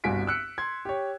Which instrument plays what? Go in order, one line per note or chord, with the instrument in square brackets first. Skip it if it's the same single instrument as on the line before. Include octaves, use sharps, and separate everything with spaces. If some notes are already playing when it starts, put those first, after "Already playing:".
[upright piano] G1 C2 F#4 G#5 B6 D7
E6 F#6 C#7
C6 G#6
G4 C#5